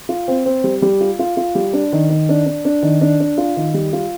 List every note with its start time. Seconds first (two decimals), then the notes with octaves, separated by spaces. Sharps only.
0.09 F4
0.28 C4
0.46 C4
0.64 G3
0.82 G3
1.01 F4
1.19 F4
1.37 F4
1.55 G3
1.73 D4
1.93 D#3
2.10 D#3
2.29 D4
2.46 D4
2.65 D4
2.83 D#3
3.01 D4
3.20 D4
3.38 F4
3.57 D#3
3.74 G3
3.93 F4